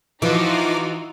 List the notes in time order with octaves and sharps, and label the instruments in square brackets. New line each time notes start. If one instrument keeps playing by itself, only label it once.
[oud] E3 [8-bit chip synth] F3 D6 [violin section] D#4 F4 F#4